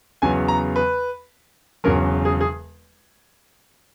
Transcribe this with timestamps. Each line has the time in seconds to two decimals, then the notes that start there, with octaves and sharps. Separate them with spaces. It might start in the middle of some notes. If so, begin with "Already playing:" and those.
0.22 E2 C#3 F#3 B3 G#5
0.48 A#5
0.76 B4
1.84 E1 E2 C#3 F#3 A#4
2.25 G#4
2.41 G#4